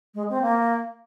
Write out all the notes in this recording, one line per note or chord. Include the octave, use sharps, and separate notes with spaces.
G#3
C4
A#3